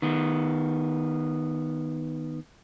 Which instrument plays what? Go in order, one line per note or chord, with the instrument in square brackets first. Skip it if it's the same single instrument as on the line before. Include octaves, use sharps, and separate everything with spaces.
[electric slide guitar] D#3 B3